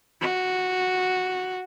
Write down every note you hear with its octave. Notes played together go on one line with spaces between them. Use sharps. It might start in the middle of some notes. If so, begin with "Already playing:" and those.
F#4